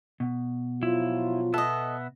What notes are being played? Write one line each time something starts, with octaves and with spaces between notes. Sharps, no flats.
B2
F3 F#3 E4 F4
B3 A4 D#5 E5